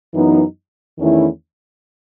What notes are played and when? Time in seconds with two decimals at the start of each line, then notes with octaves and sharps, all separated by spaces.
0.14 F#2 E3 B3 D#4
0.98 E2 D#3 A3 C#4 E4